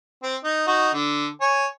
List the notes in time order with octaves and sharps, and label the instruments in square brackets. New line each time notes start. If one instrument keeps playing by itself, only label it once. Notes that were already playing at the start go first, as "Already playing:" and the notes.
[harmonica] C4
D#4
D#4 F#4
D3
C#5 G#5